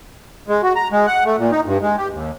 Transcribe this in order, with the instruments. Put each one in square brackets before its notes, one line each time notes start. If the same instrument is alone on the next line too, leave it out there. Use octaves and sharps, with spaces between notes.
[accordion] G#3
F#4
A#5
G#3
F#5
A3
A#2
D#4
G2
G#3
G4
D#2